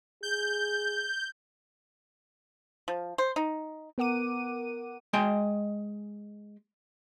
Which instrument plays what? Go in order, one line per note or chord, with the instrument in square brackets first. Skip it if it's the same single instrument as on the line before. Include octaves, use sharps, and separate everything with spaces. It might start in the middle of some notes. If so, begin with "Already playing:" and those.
[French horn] G#4 [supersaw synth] G6
[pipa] F3
C5
D#4
[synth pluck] B3 A#4 F#5 D6 D#7
[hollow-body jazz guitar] G#3 D#5 G5